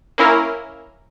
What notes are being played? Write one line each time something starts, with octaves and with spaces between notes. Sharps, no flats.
A#3 C#4 E4 A#4